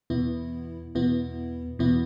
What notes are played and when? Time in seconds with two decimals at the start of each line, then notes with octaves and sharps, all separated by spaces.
0.10 E2 B2 B3 E4
0.95 E2 B2 B3 E4
1.79 E2 B2 B3 E4